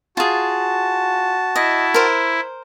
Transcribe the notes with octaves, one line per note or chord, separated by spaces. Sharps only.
F4 F#4 G#4 A5
E4 D#5
A#4 C5